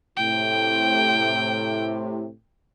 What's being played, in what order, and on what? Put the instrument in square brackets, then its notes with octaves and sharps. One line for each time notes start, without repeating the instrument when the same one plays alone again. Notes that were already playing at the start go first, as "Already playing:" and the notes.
[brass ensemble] A2 C3 [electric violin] G5